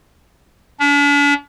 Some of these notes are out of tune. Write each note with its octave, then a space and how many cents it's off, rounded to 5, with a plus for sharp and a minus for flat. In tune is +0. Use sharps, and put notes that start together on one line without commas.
D4 -45